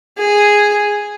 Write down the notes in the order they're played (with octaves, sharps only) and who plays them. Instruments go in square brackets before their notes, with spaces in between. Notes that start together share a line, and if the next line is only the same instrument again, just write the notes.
[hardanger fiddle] G#4